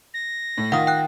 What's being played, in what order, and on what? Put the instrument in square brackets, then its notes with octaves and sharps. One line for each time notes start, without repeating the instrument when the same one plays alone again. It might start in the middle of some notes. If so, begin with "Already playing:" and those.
[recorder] A#6
[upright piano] A2
[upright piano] D#3 F4 [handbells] F#5 D#6
[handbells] G5 F#6